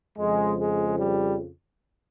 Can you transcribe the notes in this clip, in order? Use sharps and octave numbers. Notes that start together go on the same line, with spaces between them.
F2 C#3 F3 G#3
G#3
G3